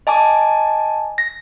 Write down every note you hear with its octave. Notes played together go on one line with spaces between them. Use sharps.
D#5 G#5 A5 D6
A#6